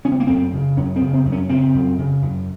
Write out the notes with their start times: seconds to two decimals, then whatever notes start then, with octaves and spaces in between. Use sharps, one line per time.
0.05 C#3 C#4
0.12 C4
0.20 A#3
0.27 F#2 C4
0.53 C#3
0.77 F#2 C#4
0.96 C4
1.02 C#3
1.14 C4
1.25 F#2
1.32 C#4
1.49 C#3 C4
1.74 F#2
1.98 C#3
2.22 F#2